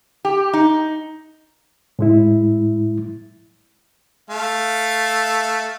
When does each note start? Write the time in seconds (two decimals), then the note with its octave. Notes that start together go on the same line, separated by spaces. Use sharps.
0.25 G4
0.53 D#4
1.99 A2 G#3 E4
4.30 A3 F5